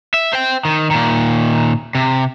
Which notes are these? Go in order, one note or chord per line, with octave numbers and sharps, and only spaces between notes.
E5
C5 G5
D#3
A#2 D#3
C3